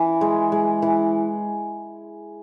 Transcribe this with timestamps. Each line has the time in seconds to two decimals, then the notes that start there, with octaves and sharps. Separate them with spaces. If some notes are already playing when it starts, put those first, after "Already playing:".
Already playing: E3
0.21 G#3
0.52 G#3
0.82 E3